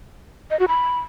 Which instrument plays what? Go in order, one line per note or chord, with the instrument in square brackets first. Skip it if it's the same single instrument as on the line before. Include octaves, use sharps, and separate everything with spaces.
[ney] D#5
F#4
B5